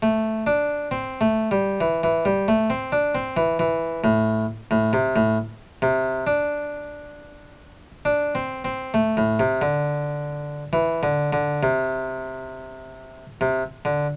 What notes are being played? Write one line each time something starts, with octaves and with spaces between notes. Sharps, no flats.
A3
D4
C4
A3
G3
E3
E3
G3
A3
C4
D4
C4
E3
E3
A2
A2
C3
A2
C3
D4
D4
C4
C4
A3
A2
C3
D3
E3
D3
D3
C3
C3
D3